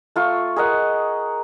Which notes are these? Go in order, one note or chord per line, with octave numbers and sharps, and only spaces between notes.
A3 F4 C#6
G#4 A#4 D#5 F#5